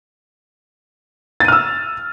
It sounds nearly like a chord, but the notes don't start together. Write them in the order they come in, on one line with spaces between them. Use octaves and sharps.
A6 D#7 F6 E6